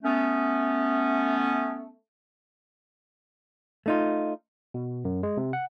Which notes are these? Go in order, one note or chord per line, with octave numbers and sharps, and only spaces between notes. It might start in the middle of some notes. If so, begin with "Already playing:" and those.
A3 B3 C#4
A3 D#4 F4
B2
F#2
G#3
C3
F#5